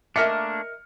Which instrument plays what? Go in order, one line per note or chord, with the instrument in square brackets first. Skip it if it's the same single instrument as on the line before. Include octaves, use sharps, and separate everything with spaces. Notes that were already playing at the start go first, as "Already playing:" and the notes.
[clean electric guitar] A3 A#3 D4 [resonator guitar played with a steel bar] A#4 D#5 E5 [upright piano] F6 C#7